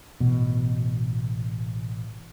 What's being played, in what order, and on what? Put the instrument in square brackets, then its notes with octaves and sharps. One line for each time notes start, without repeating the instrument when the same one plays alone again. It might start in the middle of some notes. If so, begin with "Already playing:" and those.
[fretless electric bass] A1 B2